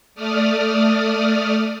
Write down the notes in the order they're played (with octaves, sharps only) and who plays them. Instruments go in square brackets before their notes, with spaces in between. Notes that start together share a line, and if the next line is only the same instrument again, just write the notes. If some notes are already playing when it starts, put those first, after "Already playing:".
[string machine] A3 D5 D#6 F6